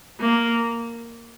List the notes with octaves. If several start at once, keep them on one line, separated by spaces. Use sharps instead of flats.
A#3